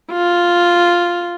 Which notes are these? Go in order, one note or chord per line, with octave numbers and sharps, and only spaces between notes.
F4